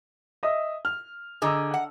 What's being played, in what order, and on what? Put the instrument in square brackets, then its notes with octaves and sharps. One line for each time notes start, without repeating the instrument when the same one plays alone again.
[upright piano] D#5 E5 D#6
F6
[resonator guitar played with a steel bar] D3 G#4 [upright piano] D#5 A#5 E6
[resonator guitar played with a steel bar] F#5